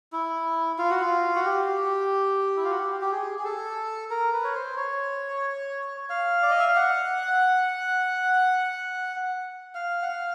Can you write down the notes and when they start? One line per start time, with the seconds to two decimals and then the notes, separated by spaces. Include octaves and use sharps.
0.12 E4
0.78 F4
0.90 F#4
1.01 F4
1.36 F#4
1.45 G4
2.57 E4
2.64 F4
2.71 F#4
2.78 G4
3.01 G4
3.12 G#4
3.39 G#4
3.45 A4
4.10 A#4
4.33 B4
4.44 C#5
4.55 C5
4.77 C#5
6.10 F5
6.42 D5
6.51 D#5
6.59 E5
6.68 F5
6.76 F#5
9.75 F5
10.02 F#5
10.09 F5